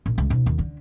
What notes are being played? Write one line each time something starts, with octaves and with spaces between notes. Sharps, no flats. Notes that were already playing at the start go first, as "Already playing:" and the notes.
A#1
C#2
B1
D#2
D3